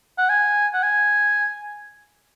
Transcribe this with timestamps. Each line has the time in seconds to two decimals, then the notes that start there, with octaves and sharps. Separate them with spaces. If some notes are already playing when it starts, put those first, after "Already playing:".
0.18 F#5
0.30 G#5
0.74 F#5
0.83 G#5